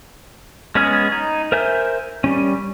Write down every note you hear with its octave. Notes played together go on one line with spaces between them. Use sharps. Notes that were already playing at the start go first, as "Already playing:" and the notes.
G#3 B3 C#4 G#4 F6
D#4
A#4 C5 E5 G#5 G6
G3 C#4